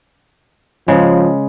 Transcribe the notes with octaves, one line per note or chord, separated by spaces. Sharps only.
C#3 F3 G#3